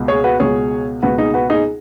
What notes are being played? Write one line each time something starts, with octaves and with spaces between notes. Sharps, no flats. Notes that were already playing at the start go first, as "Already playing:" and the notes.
Already playing: C#2 B2
G#4 C#5
F#4 B4
C#2 B2 G#4 C#5
C#2 B2 F#4 B4
D#4 G#4
F#4 B4
D#4 G#4